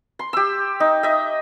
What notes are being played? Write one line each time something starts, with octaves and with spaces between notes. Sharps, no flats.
C6
G4 E6
D#4
D#5 E5